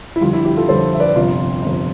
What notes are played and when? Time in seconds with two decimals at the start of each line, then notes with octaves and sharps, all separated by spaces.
0.16 E4
0.21 F2 D3 G3 F4
0.33 E4
0.45 E4 G4
0.57 F4 A4
0.68 F2 D3 G3 A4 C5
0.94 E5
1.00 B4 D5
1.15 G1 F2 C3 F4
1.62 G1 F2 C3